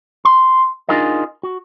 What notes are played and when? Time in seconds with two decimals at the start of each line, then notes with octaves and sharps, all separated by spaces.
0.25 C6
0.89 D4 D#4 F4 G#4 A#4 D#5
1.43 F#4